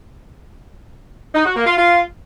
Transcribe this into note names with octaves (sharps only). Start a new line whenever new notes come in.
D#4
F#4
A#3
F4
F4